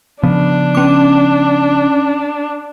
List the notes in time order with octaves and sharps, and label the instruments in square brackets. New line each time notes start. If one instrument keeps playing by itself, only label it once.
[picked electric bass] C#3 F3 B3 [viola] D4
[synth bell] C#4 D6